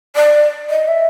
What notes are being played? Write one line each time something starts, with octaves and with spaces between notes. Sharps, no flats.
D5
D#5
E5